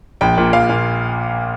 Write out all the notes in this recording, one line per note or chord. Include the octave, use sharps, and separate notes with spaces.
A#1 G5
A#2
A#1 F5
A#2